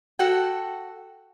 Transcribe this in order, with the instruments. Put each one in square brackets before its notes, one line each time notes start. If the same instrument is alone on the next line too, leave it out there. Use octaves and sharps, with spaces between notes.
[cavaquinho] F#4 A4 F#5 G5